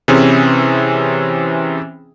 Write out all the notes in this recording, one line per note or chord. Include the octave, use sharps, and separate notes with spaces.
C3 E3 C4 C#4 G#4